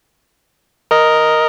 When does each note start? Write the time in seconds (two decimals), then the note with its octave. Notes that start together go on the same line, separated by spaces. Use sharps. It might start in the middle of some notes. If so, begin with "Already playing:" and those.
0.91 A#4 D#5